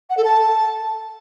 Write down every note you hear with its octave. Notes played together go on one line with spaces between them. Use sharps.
F#5
A4
A5